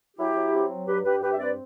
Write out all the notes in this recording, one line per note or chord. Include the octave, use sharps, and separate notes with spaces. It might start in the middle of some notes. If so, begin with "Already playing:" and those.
F#3 E4 G4
F#3
C4
F#3
G2 G4 B4
G2 G4 B4
G2 G4 B4
E5
C4 B4 D5